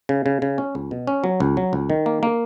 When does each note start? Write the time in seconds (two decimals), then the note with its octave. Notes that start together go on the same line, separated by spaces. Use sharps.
0.09 C#3
0.26 C#3
0.42 C#3
0.58 C#4
0.75 C#2
0.91 B2
1.07 C#4
1.24 F#3
1.40 C#2
1.57 F#3
1.73 C#2
1.90 D#3
2.06 A#3
2.23 A#3